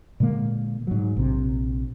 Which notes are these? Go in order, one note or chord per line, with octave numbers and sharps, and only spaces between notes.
A#2 D3 G#3 A#3
G#2 F#3
A#1 C3